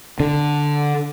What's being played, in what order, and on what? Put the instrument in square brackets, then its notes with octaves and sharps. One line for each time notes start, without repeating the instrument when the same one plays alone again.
[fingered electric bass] D3